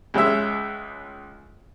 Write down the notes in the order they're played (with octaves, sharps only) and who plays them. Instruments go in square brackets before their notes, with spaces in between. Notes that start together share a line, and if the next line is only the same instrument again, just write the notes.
[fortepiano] C#2 G#3 C#5 E5